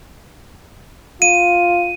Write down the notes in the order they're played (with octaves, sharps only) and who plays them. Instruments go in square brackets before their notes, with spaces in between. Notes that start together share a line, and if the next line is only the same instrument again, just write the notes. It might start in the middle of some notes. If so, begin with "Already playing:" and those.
[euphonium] F4 [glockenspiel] D#7